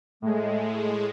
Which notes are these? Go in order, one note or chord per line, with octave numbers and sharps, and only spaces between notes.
A2 G#3 A3